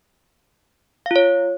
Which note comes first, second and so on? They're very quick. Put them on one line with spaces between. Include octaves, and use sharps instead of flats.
F5 F4 C#5